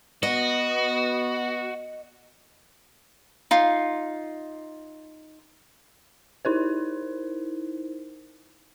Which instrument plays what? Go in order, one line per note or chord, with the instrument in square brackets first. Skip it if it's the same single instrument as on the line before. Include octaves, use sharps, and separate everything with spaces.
[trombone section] B3 [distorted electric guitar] F#4 [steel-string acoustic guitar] D#5
[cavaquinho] D#4 F4
[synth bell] D#4 E4 A#4 C5